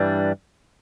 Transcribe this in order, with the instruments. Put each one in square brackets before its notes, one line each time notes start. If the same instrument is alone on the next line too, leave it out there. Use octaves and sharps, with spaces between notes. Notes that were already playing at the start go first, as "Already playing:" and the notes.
Already playing: [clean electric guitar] G2 E3 G3 D4